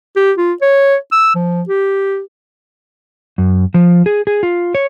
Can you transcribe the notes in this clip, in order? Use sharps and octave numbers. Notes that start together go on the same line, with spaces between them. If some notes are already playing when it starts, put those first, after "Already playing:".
G4
F4
C#5
E6
F3
G4
F#2
F3
G#4
G#4
F4
C#5